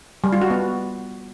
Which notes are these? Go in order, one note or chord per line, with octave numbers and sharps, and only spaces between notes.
G3
F4
F#4
B3